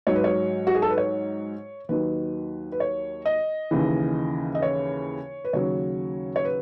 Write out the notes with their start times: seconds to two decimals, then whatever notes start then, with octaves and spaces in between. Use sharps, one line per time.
0.07 G#2 F#3 C#5
0.15 B4
0.24 C#5
0.67 F#4
0.75 G#4
0.82 A4
0.90 B4
0.98 C#5
1.89 D#2 D#3 F#3 B4
2.72 B4
2.80 C#5
3.25 D#5
3.71 D#2 C#3 E3
4.55 D#5
4.62 C#5
5.44 B4
5.53 D#2 C#3 F#3 C#5
6.36 C#5
6.45 B4